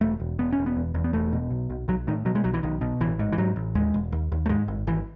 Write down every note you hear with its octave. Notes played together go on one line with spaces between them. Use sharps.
E1 A3
E1
E1 B3
C#4
E1
B3
E2
E2
B3
E1 A3
B2
B1
B1
B1 F#3
A2 D#3
B2 F#3
G#3
B1 F#3
E3
B1 D#3
B2
A1 E3
G#2
E3
G#2 F#3
A1
D#2 G#3
E1
D#2
D#2
A3
G#2 G#3
G#1
G#1 E3